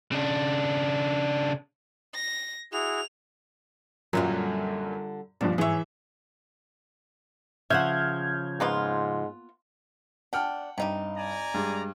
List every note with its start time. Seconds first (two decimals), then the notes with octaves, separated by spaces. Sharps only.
0.12 C#3 D4
2.15 A#6
2.73 E4 F#4 G#4 F7
4.13 F#2 A#2 D3 F#3 G3 F4
5.41 A#1 G2 B2 F3 D4
5.58 G#2 E3 G#4 C#5 E5
7.70 C#3 F3 E5 F#5 F6 G6 G#6
8.60 G#2 A#3 B3 F4
10.33 D4 F#5 G5 F6
10.78 G2 C3 D#4 G4
11.17 D5 G#5 A#5
11.54 G2 G#3